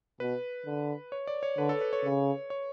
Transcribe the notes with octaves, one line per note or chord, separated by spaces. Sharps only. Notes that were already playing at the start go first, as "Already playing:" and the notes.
B2 B4
D3
C#5
D5
C#5
D3 B4
A4
B4
C#5
C#3
C#5